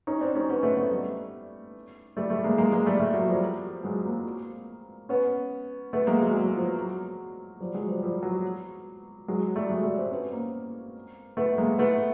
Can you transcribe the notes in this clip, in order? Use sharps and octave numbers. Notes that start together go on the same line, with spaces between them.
C#4 D#4
C4 D4
C#4 D#4
B3 C#4
A3 B3
A3 B3
G3 A3
G3 A3
G3 A3
G#3 A#3
G#3 A#3
G#3 A#3
G3 A3
G3 A3
F#3
F3 G3
F#3 G#3
A#3 C4
B3 C#4
A3 B3
G#3 A#3
F#3 G#3
F#3
F3
F#3
F3 G3
F#3 G#3
F3 G3
F3 G3
F#3
F#3 G#3
G3 A3
F#3 G#3
G3 A3
C4 D4
B3 C#4
A#3 C4
A3 B3
G#3 A#3
A3 B3